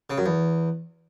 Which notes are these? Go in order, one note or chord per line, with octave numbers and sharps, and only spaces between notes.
C#3
F#2
E2